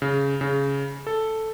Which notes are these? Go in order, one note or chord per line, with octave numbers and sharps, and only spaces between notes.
C#3
C#3
A4